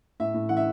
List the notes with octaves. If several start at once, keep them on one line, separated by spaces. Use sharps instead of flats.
A2 E5
A2
E3 F#5
E5